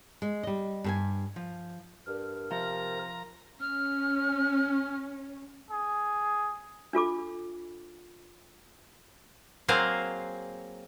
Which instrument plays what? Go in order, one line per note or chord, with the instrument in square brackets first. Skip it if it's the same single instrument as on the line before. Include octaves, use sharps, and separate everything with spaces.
[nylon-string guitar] G#3
G3 D#5
G2 A4 G#5
F3
[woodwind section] G2 [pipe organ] A#4
[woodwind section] C3 [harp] F3 [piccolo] A#5
[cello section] C#4 [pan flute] F6
[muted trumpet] G#4
[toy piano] D4 F4 A4 D6
[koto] F#3 A#3 C4 G#4 C5 F5